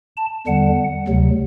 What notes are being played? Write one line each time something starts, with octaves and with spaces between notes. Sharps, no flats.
A5
E2 D3 G3 F#5
D2 C3 F#3